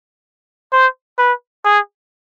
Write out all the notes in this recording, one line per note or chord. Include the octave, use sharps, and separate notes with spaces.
C5
B4
G#4